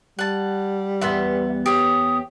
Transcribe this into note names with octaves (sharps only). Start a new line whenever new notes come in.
G3 F#5 A5
E2 B3 E5 F#5 C6
G4 C#5 D#6